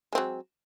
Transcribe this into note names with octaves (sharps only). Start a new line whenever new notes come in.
F#3 G#3 C4